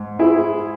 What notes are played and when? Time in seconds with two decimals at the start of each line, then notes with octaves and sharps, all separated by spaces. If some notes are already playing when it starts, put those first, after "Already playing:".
Already playing: G#2
0.19 E4 G#4